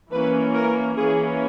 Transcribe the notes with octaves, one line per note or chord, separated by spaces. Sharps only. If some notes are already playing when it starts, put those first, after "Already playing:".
E3 A#3 C#4 B4
A#4
E3 A#3 C#4 G#4